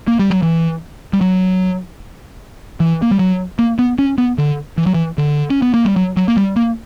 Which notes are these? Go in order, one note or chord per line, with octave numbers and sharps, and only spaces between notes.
A#3
G3
F#3
E3
G3
F#3
E3
A#3
G3
F#3
A#3
B3
C#4
B3
D3
E3
F#3
E3
D3
C#4
B3
A#3
G3
F#3
F#3
A#3
G3
A#3